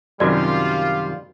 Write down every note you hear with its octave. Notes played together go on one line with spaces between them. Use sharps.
F#2 C3 D#3 G3 F4 F#4 D5